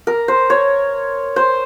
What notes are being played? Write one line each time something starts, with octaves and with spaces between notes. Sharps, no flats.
A#4
C5
C#5
C5